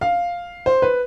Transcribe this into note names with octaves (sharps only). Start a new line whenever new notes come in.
F5
C5
B4